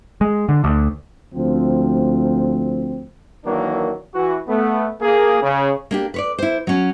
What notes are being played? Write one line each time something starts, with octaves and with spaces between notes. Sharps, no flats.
G#3
D3
D2
D2 F3 C4
D#3 E3 F#3 A#3 D4
E3 F#4
A3 B3
A#3 G#4
C#3
A#3 D4 G4
B4 C#5 D5
E4 C5
F#3 C#4